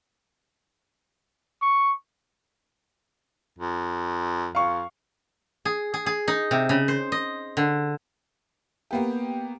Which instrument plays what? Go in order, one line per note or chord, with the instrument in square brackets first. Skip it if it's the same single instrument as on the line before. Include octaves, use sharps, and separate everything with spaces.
[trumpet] C#6
[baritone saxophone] F2
[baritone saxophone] F2 [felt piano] F5 C#6
[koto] G#4
G#4
G#4
D#4
C3
C#3
C5
D#5
D3
[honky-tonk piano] A#3 B3 G4